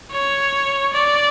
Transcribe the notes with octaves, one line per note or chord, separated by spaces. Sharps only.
C#5
D5